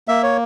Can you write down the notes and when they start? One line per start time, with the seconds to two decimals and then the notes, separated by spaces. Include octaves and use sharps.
0.08 A#3 E5
0.23 C#5